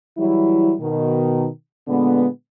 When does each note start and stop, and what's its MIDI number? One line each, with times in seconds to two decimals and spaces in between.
0.18 0.74 52
0.18 0.74 54
0.18 0.74 55
0.18 0.74 64
0.81 1.48 47
0.81 1.48 51
1.88 2.27 46
1.88 2.27 50
1.88 2.27 56
1.88 2.27 59